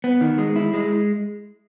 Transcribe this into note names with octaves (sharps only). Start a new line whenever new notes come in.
B3
D#3
G#3
E4
G#3